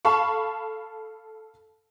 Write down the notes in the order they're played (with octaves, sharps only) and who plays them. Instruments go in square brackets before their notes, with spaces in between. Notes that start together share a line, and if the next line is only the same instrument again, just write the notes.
[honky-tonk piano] A4 F5 A5 B5 C#6